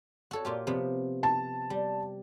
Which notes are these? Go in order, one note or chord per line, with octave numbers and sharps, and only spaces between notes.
F#4 A4 C#5
A#2 F4 G4
C3 F3 B3
A5
G3